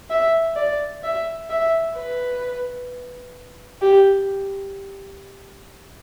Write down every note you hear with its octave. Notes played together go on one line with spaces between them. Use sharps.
E5
D5
E5
E5
B4
G4